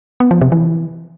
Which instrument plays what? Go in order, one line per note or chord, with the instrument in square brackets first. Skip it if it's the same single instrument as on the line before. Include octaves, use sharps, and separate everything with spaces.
[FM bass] B3
F3
C3
E3